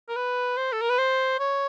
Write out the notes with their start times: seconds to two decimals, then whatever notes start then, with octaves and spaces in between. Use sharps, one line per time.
0.08 A#4
0.16 B4
0.57 C5
0.72 A4
0.81 A#4
0.90 B4
0.98 C5
1.39 C#5